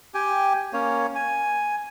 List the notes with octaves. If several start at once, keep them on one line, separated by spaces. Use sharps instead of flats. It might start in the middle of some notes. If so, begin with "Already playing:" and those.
G4 G5 G#5
A#3 C#4 C#5
G#5